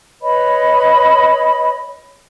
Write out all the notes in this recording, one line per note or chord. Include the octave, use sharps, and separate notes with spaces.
B4 C#5 D#5 B5